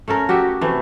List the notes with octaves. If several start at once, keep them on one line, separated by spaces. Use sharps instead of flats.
A3 C#4 A4 A#4
F#4 G4 D#5 E5
C3 E3 A3